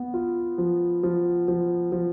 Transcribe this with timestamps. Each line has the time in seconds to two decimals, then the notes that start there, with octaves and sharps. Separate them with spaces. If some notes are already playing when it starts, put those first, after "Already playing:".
Already playing: B3
0.14 F4
0.58 F3
1.03 F3
1.48 F3
1.92 F3